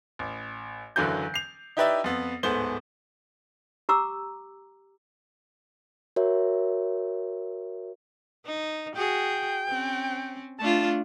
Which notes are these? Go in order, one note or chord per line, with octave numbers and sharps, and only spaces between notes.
A1
F#1 D3 E3 F#3 G6
C7 F7
D#4 E4 G4 B4 D5 E5
F2 B3
D1 G#2 A3 B3 C5 G7
G4 A#5 D6 E6
F#4 A#4 C#5 E5
D#4
F#4 G#4 G5
C4 C#4
A3 D4 F4 A5